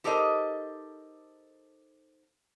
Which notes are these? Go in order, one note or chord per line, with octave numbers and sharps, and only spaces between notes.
D#4 G4 A4 A#4 C5 D#5